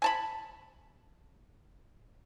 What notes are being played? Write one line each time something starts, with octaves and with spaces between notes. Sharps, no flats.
G#5 A5 B5